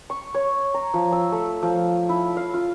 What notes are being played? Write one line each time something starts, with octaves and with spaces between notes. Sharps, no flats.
C#6
C#5
A#5
F3
E6
A3
F3
E4
F5
F4